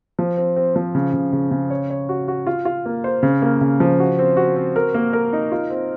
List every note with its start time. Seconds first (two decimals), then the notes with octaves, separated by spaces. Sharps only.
0.19 F3
0.37 C4
0.56 C4
0.76 F3
0.95 C#3
1.13 C#3
1.33 C#3
1.51 C#3
1.70 C#5
1.90 C#5
2.09 F#4
2.28 F#4
2.47 F4
2.65 F4
2.85 A#3
3.04 C5
3.23 C#3
3.42 A#3
3.61 C#3
3.80 F3
4.00 F#4
4.19 C4
4.37 F#4
4.56 C4
4.76 A#4
4.94 A#3
5.13 A#4
5.33 D#4
5.52 F4
5.70 C4